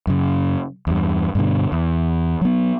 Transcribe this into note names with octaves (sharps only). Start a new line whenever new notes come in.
F#2 C#3
E2 G2
G2 B2 D3
E2
F#3 B3